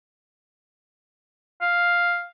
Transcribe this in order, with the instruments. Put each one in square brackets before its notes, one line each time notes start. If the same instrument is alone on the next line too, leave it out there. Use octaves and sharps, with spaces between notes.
[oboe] F5